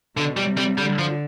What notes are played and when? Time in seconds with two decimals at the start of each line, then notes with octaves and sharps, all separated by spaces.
0.17 B2 D3
0.37 G3
0.48 C3
0.57 G3
0.78 D3 G3
0.99 F3